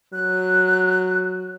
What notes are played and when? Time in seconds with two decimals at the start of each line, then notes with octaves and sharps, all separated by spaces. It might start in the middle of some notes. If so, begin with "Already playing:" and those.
0.13 F#3 F#6